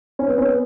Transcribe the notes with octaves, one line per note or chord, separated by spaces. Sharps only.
C#4
B3
C#4
B3